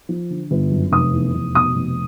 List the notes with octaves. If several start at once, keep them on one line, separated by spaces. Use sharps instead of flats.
F3
D3
G1
F#2
F1 D#6
E2
F1
B2 D#6
F1